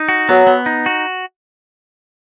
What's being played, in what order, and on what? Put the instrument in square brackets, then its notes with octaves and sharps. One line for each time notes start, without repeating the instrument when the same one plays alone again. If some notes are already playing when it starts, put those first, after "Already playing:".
Already playing: [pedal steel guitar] D#4
F#4
[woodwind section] F#3 [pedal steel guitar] B3
[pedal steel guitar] B3
D#4
F#4